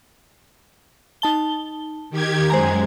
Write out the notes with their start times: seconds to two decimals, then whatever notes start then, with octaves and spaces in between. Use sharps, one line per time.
1.22 D#4 A5 G7
2.10 D#3 G4 G#6
2.50 F#2 G#3 C5 G#5 A#5